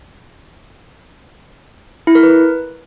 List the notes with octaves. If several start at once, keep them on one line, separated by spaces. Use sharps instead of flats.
E4
A#4
B4